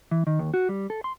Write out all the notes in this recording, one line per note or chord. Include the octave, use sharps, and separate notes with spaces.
E3
D#3
D#2
F#4
G3
A4
C6